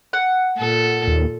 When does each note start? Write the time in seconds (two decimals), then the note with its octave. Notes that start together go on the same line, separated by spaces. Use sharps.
0.13 F#5
0.58 A#2 A4
1.07 D#2